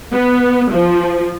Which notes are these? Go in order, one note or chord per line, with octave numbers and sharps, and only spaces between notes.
B3
F3